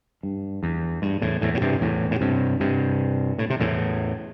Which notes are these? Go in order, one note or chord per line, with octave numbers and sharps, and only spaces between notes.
G2
E2
G2
E2 A2
E2 A2
A2
G2 C3
E2 A2
A2
G2 C3
G2 C3
A2
C3
E2 A2